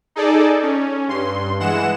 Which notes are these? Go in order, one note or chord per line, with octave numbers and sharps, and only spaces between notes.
D#4 G#4 A4 D5
C#4
G2 C6
E3 G#3 F#5 E7